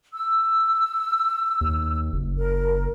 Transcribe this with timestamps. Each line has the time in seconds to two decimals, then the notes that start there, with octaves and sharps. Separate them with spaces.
0.13 E6
1.61 D#2
2.13 F#1
2.37 A#4